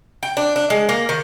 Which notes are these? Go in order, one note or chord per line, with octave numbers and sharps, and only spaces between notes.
G5
D4
D4
G#3
A#3
D#3